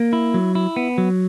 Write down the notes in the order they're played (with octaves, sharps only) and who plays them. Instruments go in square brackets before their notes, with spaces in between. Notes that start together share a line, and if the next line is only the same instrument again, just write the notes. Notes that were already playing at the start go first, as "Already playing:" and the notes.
Already playing: [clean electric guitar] A#3
E4
F#3
E4
B3
F#3